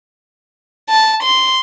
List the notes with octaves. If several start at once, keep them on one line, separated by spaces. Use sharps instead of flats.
A5
C6